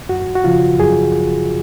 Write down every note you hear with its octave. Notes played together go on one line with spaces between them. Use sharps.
F#2 F#4
F#4
C#3 F3 F4
F#2 G#4